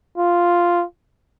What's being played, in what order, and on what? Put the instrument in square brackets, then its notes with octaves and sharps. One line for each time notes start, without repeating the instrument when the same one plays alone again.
[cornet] F4